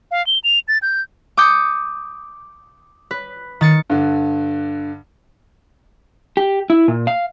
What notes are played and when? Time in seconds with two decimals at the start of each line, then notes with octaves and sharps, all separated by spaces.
0.11 F5
0.27 G7
0.44 F7
0.68 A6
0.82 G6
1.37 D6 D#6 G6 C#7
3.11 B4
3.61 D#3 A6 C#7
3.90 G2 D3
6.37 G4
6.70 E4
6.88 A#2
7.07 F5